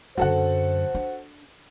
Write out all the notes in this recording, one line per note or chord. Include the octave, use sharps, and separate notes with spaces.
F#2 D3 F#4 A4 C5 F#5
D4